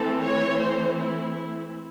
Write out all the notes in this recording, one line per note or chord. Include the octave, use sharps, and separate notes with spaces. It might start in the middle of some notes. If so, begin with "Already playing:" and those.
Already playing: E3 A3 C4 A4
C#5
C5
E4
E4